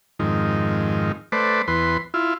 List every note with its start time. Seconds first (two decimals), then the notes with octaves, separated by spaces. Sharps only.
0.19 F2 G#2 D#3
1.32 A3 B4 C5 D5
1.68 E2 B4 C6
2.14 E4 F4